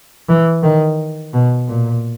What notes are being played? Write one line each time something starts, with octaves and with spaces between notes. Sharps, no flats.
E3
D#3
B2
A#2